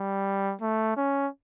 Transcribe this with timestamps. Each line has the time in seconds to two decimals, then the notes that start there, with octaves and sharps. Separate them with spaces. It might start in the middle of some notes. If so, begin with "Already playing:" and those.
Already playing: G3
0.61 A3
0.96 C#4